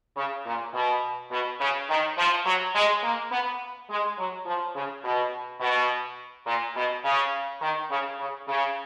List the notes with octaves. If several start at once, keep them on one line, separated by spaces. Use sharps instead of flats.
C#3
A#2
B2
B2
C#3
D#3
F3
F#3
G#3
A#3
B3
G#3
F#3
F3
C#3
B2
B2
A#2
B2
C#3
D#3
C#3
C#3
C#3